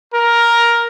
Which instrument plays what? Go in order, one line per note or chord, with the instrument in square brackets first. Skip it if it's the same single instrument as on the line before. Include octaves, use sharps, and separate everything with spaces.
[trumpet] A#4